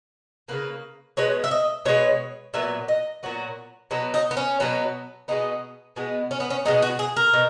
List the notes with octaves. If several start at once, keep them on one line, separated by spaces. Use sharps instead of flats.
C#3 E3 A#3 B4
B2 G#3 B3 C#5
E5
D#5
B2 G#3 B3 C#5
A#2 F#3 B3 E5
D#5
A#2 F#3 B3 F#4
B2 F#3 B3
D#4
B3
C#4
B2 F#3 B3
B2 G#3 B3 D#4
B2 G#3 B3
C#4
B3
C#4
B2 G#3 B3 D#4
F#4
G#4
A#4
B2